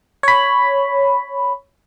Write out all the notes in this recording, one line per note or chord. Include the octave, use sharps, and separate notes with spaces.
C#5 B5